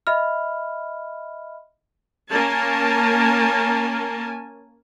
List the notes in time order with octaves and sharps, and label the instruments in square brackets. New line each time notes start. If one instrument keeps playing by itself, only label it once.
[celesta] D#5 E5 B5 F6
[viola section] A#3 C#4 A#4 G#5 A5